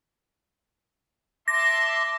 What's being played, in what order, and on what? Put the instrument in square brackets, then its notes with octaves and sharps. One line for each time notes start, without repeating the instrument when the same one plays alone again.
[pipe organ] E5 A5 C6 [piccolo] D6 [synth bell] A#6